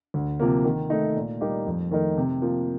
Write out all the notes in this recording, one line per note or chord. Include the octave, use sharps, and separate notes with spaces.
D2
C3 F3 A#3
D#3
A3 D#4
A#2
G3 A#3 D#4 G4
F2
D#3 A3 D#4 A#4
C3
F3 A#3